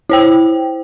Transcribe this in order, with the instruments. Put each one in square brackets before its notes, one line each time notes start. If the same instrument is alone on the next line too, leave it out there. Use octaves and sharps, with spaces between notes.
[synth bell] E4 C5 G5